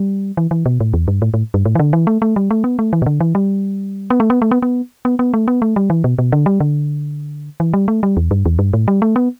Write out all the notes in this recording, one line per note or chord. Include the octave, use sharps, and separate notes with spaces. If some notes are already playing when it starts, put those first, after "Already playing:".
Already playing: G3
E3
E3
B2
A2
E2
G2
A2
A2
G2
A2
E3
D3
E3
A3
A3
G3
A3
B3
A3
E3
B2
D3
E3
G3
B3
A3
B3
A3
B3
B3
B3
B3
A3
B3
A3
G3
E3
B2
B2
D3
G3
D3
E3
G3
A3
G3
E2
G2
E2
G2
A2
G3
A3
B3